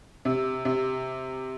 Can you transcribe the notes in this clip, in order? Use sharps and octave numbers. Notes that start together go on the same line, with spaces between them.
C3
C3